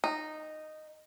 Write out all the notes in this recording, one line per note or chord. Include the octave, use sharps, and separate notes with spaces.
D#4